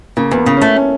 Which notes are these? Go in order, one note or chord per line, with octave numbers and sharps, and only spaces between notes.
C#3 A#3
E2
B3
C#3
A3 C#4
C#4